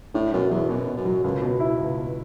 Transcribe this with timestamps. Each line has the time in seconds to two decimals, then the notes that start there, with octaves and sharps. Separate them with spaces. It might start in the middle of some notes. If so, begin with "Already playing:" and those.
0.14 A2 D4
0.32 F#2 B2
0.50 E2 F#3
0.69 F#2 B2
0.87 B2
0.97 F#2
1.05 F#3
1.24 C#2 F#2
1.42 B2
1.60 E4
1.79 C#2
1.97 B2